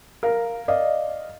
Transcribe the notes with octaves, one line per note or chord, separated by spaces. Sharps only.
A#4 F5
D5 D#5 F5